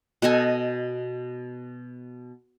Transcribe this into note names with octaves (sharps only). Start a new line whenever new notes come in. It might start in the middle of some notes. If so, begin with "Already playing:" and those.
B2 A4 D#5 G#5